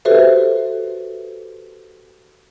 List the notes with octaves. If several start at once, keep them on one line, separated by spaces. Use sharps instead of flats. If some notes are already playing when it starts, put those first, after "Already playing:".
F#4 G4 A4 B4 C5 E5